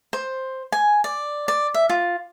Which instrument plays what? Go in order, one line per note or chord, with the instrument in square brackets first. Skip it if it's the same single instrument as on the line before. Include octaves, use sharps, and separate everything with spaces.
[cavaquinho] C5
G#5
D5
D5
E5
F4